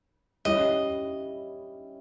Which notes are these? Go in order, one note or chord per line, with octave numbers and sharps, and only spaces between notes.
G3 C#4 E4 D#5